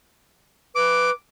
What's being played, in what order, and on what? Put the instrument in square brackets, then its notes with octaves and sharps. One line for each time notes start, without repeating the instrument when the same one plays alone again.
[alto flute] B4 [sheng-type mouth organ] D6